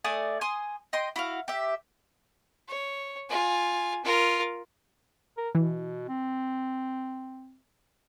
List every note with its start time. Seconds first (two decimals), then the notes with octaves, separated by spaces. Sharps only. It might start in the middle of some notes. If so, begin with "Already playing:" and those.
0.04 A3 D5 G#5 D#6
0.41 G#5 C6 D#6
0.93 D#5 G5 C6
1.16 E4 F#4 F5
1.48 G4 E5
2.68 C#5
3.29 F4 G#5
4.04 F4 A#4
5.37 A#4
5.55 B2 E3
6.08 C4